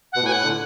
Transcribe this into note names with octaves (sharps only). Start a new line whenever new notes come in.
B2 F#5
A2 G#5
F#5
D3